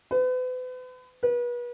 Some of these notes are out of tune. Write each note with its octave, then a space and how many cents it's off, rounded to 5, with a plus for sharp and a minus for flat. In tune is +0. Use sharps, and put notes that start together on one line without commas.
B4 +40
B4 -35